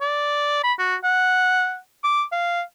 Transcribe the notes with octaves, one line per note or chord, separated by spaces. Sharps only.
D5
B5
F#4
F#5
D6
F5